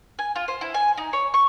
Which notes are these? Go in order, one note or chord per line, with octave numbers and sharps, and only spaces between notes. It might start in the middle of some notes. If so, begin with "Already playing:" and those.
G#5
F4
C5
E4
G#5
D#4
C#5
C#6